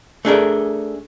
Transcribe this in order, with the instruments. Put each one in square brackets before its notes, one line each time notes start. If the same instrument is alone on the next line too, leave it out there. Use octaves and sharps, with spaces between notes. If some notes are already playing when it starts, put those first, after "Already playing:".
[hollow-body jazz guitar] A3 D4 G#4 A#4